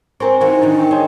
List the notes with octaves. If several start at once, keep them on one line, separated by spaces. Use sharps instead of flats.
C4 A#4 C5 G#5 C#6
E3 D#4 E4 F#4 C#6
D#3 E3 D4
A#4 G5 C#6
G#4 C#5 D#5 C6